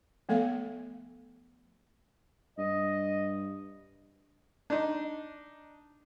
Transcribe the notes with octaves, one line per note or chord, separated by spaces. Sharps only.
F3 A3 B3 A4 E5 F5
G2 D#5
D4 D#4